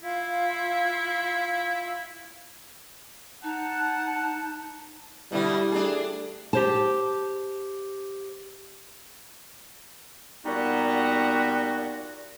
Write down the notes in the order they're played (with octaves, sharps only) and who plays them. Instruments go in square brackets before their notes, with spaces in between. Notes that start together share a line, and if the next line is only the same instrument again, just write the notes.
[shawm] E4 [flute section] F4 F5
[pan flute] D#4 [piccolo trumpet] F#5 [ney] A5
[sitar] B2 D3 A3 [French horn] G3 [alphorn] E4
[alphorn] A3 [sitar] D4 G#4
[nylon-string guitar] G4 C5 A5
[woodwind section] A#2 G3 B3 D#4 F#4